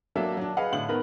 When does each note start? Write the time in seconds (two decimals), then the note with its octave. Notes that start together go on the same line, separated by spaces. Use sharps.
0.16 F#3 A#3 D4 A4 E5
0.37 F#3 D4
0.57 G#4 B4 D#5 F5 F#5
0.72 A2 D3 F#7
0.88 D#3 B3 A#4 B4